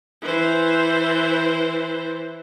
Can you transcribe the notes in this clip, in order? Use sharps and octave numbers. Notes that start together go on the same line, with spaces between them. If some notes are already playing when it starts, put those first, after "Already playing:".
E3 C5